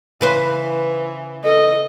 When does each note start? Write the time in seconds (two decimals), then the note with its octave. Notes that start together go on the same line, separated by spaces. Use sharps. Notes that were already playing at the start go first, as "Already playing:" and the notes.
0.21 C#3 E3 B4 C5
1.44 A4 D#5